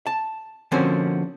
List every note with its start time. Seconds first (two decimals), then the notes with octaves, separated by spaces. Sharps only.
0.07 A5
0.72 D3 F3 A#3 C4 C#4 F#4